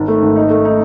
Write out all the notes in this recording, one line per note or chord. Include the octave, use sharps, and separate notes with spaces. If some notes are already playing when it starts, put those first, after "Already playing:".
Already playing: G#1
A3
G#1
D#4
A3
D#4